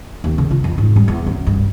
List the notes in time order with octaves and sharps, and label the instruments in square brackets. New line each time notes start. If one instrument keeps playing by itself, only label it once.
[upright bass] D#2
C#3
F4
F2
G#2
G3
E2
F#2
G2